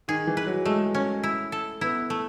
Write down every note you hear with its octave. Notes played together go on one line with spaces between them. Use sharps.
D#3 G#4
E3
B4
F#3
G#3 A3
C#4
E4
A4
B3 E4
A3